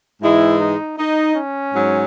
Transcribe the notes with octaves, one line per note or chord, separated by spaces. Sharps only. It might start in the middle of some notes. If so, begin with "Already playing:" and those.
G#2 E3 G#3 E4
D#4
D#4
C#4
G#2 F#3